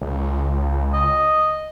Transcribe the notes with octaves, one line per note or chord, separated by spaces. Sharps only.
C#2
D#5